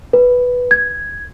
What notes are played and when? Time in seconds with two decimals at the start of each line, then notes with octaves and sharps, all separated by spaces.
0.13 B4
0.71 G#6